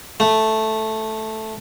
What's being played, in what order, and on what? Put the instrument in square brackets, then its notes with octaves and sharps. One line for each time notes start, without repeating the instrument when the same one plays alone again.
[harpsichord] A3